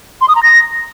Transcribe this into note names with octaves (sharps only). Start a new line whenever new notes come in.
C6
D#6
A#5
A#6